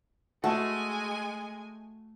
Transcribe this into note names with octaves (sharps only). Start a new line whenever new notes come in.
G#3 A3 F#4 G#5 A5